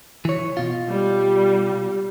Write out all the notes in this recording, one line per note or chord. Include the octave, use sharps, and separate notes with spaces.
E3 C#5
B2 F4
G3